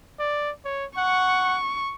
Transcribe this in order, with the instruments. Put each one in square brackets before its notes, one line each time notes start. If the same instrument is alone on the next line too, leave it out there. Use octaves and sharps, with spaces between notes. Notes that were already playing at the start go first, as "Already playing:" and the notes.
[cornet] D5
C#5
[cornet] F#5 [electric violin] C#6